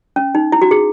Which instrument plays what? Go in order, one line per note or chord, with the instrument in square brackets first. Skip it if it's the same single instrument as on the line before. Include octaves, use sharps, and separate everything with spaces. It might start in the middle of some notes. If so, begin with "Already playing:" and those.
[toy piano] C#4
D#4
E4
F#4
G#4